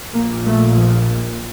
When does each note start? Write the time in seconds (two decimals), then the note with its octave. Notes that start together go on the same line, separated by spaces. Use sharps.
0.13 A#1 A#2 A#3
0.46 A3
0.76 F3